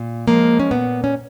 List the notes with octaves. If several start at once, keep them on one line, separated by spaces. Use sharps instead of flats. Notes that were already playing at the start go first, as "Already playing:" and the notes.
Already playing: A#2
F3 G#3 A#3
C#4
A#2 B3
C#4